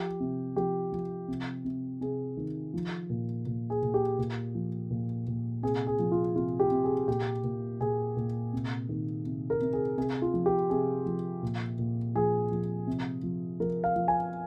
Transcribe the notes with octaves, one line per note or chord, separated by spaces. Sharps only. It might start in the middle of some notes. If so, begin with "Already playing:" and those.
Already playing: F3 G4
C3
F3 G4
F3
C3
C3
C3 G#4
D#3
F3
A#2
A#2
G#4
A#2
G4
A#2
F3
A#2
A#2
C3 G#4
G#4
F3
F4
C3 F4
G4
C3
G#4
A#2 G4
A#2
A#2 G#4
A#2
C3
D#3
C3
A#4
C3
G#4
C3 G#4
F4
F3
G4
C3 G#4
F3
A#2
A#2
F3 G#4
F3
C3
F3
F3 A#4
F5
F3
G#5